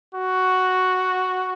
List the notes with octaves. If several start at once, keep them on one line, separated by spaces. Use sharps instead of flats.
F#4